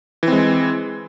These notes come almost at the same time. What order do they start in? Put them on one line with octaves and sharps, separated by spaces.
E3 C4 G#3